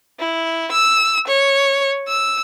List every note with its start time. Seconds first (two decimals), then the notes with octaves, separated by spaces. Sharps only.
0.19 E4
0.72 E6
1.28 C#5
2.08 E6